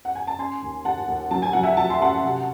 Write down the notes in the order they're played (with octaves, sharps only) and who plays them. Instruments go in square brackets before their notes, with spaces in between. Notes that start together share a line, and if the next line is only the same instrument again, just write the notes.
[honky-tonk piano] F#5
G#5
A5
C#4 G#5 C6
D#2
D#2 F#5 A5
D#2
F#3 A5
G#5
F#3 F#5
E5 G#5
F#3 A5
C6
C#4 F#5 A5
C3